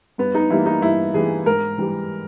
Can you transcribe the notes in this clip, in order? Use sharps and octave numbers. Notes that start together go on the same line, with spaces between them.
G2 B3
D#4
E3 G3 A#3 E4
D#4
G2 E4
E3 G3 A#3 G#4
G#2 A#4
E3 G3